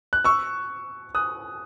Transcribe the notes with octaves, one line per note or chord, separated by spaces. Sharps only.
F#6
C#6 E6
D#6 F#6